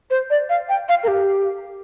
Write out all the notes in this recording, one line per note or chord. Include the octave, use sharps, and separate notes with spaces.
C5
D5
F5
G5
F5
A#4
G4